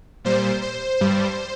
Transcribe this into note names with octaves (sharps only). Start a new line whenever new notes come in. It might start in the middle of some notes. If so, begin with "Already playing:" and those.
A#2 G3 C5
C5
G2 G3